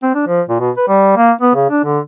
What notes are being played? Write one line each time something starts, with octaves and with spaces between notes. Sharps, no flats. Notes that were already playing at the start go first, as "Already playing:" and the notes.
C4
D4
F3
A#2
B2
B4
G3
A#3
B3
C#3
D4
D3